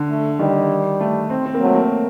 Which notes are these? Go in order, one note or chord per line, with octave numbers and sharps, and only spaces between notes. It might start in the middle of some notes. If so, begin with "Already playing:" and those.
Already playing: D3
A3
D#3 G3
A3
C4
C4
A#3
F#3 A3
A#3